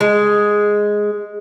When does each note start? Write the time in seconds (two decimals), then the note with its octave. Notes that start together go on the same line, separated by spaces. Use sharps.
0.01 G#3